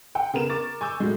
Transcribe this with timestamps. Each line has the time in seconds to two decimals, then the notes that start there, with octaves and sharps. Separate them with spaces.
0.15 F#5 G5
0.34 C#3 B3 A#4 E7
0.50 A#4 C#6 D6 A6
0.81 G#5 C#6 D6 E6 G6
1.00 A2 F#3 G#3